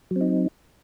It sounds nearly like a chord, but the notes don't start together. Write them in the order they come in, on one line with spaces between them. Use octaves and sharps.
F#3 C4 D#4